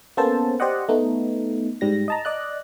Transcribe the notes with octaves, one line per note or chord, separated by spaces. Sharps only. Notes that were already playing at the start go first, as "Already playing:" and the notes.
A#3 B3 C#4 A4 C5 A5
G4 C5 D5 D#5 F#5
A3 B3 D#4
G#2 G3 A#6
D#5 A5 A#5
D5 D#5 F#6